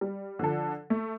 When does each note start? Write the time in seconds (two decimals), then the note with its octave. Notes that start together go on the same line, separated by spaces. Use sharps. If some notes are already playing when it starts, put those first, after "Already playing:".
0.01 G3
0.39 D3 F3 A4
0.90 A3